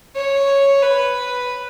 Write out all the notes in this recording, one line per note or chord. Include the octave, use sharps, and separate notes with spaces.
C#5
B4